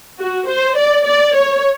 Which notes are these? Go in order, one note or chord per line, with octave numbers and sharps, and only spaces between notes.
F#4
C5
D5
D5
C#5